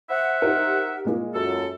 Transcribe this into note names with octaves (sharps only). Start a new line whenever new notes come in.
C5 E5 F#5
D#4 G4 A#4
A#2 G#3 A#3
F#2 A4